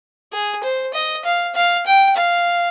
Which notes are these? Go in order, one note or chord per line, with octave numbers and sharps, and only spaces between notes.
G#4
C5
D#5
F5
F5
G5
F5